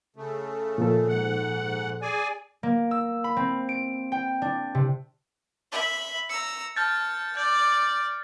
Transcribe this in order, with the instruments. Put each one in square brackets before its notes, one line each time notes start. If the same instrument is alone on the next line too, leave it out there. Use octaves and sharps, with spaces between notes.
[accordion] C#3 A3
[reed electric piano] A#2 F3 A4
[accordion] G#2 F#5
G#4 D5 G#5
[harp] A#3
E6
B5
C4
D7
G5
D4
C3
[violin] E5 B5
[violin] A#5 E6 [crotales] C#7
[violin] A5 [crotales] F6 G6 A6
[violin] D5 [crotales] G6